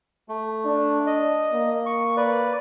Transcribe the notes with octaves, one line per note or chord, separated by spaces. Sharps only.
A3
D4
D#5
A#3
C#6
B4 D5